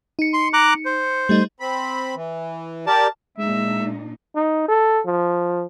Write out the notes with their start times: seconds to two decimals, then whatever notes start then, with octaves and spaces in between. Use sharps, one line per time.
0.19 D#4 C#7
0.34 C6
0.53 A#5 D6 F#6
0.85 C5
1.29 G3 A3 D#4
1.60 C4 B5
2.15 E3
2.87 G4 A#4 D5 A5
3.38 A#2 G#3 D4 D#4 E5
4.35 D#4
4.68 A4
5.06 F3